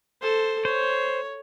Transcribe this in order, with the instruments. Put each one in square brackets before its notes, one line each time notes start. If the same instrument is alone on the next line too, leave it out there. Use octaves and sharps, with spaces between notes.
[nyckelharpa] A4 C5
[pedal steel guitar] C5 [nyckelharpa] C#5